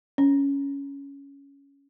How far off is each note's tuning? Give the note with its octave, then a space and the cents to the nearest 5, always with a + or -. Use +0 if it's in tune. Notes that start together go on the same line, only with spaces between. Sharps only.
C#4 +10